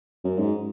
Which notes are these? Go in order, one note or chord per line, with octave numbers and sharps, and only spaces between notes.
F#2
G#2